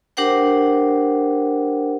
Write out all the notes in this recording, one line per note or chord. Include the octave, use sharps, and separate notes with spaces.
D4 G4 A#4 C5 F#5 G5